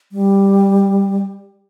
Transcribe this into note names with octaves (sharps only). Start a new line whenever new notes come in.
G3